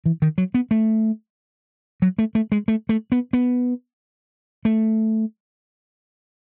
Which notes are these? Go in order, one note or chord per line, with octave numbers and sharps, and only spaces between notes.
E3
D#3
F#3
B3
A3
F#3
A3
A3
G#3
A3
A3
B3
B3
A3